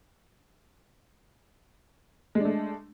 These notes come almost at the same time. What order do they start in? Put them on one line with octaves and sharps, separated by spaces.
G#3 D4 A3